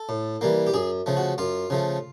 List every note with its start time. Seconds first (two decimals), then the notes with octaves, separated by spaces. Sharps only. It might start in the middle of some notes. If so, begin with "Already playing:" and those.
Already playing: A4
0.09 A2
0.41 E3 G3 A#3
0.67 G4
0.74 F#2 G#4
1.06 C#3 F3 A3
1.17 F#4
1.38 F#2 F4
1.70 C#3 F3 A3